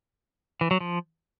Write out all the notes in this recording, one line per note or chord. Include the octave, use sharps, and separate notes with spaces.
E3
F#3
F3